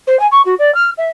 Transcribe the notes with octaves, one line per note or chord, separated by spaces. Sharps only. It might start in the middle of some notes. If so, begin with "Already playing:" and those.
C5
G#5
C#6
F#4
D5
F6
E5